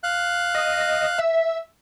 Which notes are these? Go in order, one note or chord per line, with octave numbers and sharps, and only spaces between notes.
F5 F#6
D#5
E5